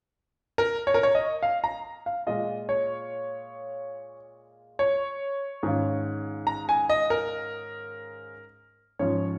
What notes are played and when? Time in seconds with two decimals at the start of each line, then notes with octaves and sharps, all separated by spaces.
0.58 A#4
0.87 C#5
0.94 A#4
1.03 C#5
1.15 D#5
1.43 F5
1.64 A#5
2.06 F5
2.27 A#2 G#3 F4 D#5
2.69 C#5
4.79 C#5
5.63 G#2 D#3 C#4 F4
6.47 A#5
6.69 G#5
6.89 D#5
7.10 A#4
8.99 G#2 F3 C#4 F4 C#5